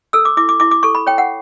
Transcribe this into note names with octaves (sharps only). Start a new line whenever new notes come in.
A4 E6
D6
E4 D6
D6
E4 D6
D6
A4 C#6
B5
C#5 G5
F#5